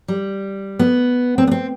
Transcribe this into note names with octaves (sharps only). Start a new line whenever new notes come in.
G3
B3
C4
B3
C4